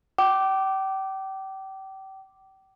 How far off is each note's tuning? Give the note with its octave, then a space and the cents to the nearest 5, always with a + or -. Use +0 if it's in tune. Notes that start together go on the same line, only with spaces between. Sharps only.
G5 -35 D6 +0